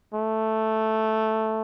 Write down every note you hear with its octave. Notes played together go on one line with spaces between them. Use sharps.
A3